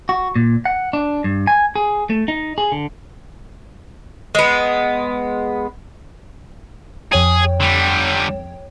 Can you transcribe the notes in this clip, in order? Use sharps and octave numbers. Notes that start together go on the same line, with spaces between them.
F#4
A#2
F#5
D4
G2
G#5
G#4
A3
D#4
G#4
D3
G#3 B3
F2 G#4 C#5 G5
D3 G3